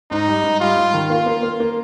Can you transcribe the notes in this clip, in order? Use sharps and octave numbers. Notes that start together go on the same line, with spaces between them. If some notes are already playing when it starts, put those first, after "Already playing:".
G#2 D#4
G3
G#2
G3 F4
G#2
D#3
A#3 F4
A#3
A#3
A#3